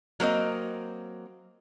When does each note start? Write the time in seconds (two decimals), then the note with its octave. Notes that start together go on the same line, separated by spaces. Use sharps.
0.20 F#3 A#3 C4 D#5